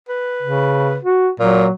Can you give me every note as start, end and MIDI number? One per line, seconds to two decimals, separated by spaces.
0.08 0.98 71
0.42 0.97 49
1.05 1.29 66
1.39 1.66 46
1.39 1.71 54